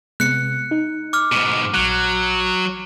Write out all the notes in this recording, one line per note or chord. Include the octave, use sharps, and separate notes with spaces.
C3 G#3 B3 F#6 C#7
D#4
D6 F6
G#2 B2
A#1 F#3 F#6